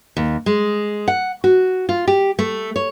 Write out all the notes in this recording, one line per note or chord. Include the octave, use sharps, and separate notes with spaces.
D#2
G#3
F#5
F#4
F4
G4
A3
C#5